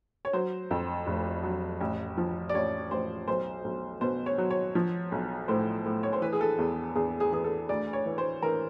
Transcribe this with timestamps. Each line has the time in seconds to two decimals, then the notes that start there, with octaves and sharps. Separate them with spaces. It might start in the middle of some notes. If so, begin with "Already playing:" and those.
0.25 C#5
0.33 F#3 C5
0.71 F2
1.07 F1
1.43 F#3
1.81 A1
2.17 F3
2.49 D5
2.54 A1 C#5
2.91 A1 C5
3.28 B1 C5
3.64 B1
4.01 B2 C5
4.26 C#5
4.38 F#3
4.50 C#5
4.75 F3
5.12 B1
5.48 A2 C5
5.85 A2
6.03 C#5
6.13 C5
6.22 E3 B4
6.33 G#4
6.41 A4
6.58 E2
6.95 E2 G#4
7.20 G#4
7.32 E3 G#4
7.44 A4
7.69 D2 D5
7.93 C#5
8.06 E3
8.18 C5
8.42 E3 A#4